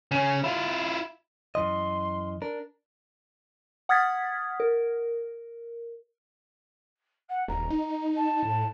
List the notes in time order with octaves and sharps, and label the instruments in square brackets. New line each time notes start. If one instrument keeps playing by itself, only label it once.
[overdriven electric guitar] C#3 C#4
E4 F4
[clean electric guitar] F#2 E3 D#5 [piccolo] C6
[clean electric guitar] D4 A#4
[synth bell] F#5 D#6 F6 G#6 A6 B6
A#4
[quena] F#5
[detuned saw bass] D#1 [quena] A#5
[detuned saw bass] D#4
[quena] A5
[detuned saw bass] A2